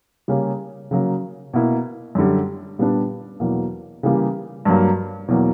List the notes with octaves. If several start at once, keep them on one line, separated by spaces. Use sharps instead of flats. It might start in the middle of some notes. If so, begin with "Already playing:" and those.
C#3 G3 A#3 C#4
C#3 F#3 A#3
B2 A#3 E4
F#2 D3 G3
A#2 G3 B3 D4
E2 B2 F#3 A#3
C#3 E3 G3 A#3
G2 F#3 A#3
E2 B2 F#3 A#3